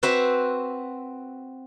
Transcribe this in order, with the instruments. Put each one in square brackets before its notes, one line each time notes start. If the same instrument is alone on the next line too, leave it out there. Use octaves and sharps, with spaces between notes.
[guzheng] C4 F#4 B4 C5 E5